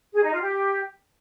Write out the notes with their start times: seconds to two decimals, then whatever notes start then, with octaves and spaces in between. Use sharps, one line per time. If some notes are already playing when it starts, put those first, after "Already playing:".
0.14 G#4
0.23 D#4
0.32 F4
0.41 G4